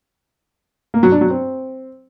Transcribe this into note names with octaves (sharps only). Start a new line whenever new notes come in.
A#3
F#3
D4
F#3
C4